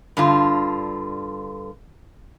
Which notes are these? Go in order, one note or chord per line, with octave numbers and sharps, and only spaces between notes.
G2 D3 F4